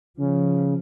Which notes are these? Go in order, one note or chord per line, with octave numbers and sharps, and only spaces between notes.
C#3 F3